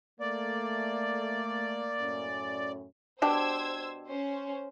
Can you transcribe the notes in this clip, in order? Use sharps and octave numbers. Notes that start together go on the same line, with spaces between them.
A3 A#3 D5
F#2 A2 C#4
B2 D4 G4 C5 E6 G#6
C#4 C5